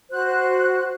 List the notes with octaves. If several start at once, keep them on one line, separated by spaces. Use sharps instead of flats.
F#4 C5 F#6